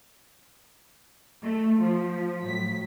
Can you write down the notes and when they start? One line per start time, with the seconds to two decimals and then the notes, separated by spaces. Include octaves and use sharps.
1.44 A3
1.81 F3
2.44 A2 F#3 B6